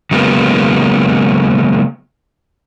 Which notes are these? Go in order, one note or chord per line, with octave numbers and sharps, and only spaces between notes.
C#3 F#3 G#3 A#3 B3